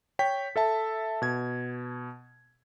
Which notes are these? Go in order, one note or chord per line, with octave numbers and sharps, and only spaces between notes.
C#5 G5 B6
A4 E5 A5
B2 G#6